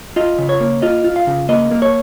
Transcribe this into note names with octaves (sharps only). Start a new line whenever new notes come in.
F4 D#5
C#3
C#5
A#3
F4 D#5
F4
F5
C#3
A#3 D#5
A#3
C#5